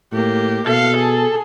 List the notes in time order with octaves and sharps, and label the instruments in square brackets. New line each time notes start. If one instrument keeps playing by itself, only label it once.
[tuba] A2 [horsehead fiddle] A#3 G4
[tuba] B2 [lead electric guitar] A4 [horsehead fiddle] F5
[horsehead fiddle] G#4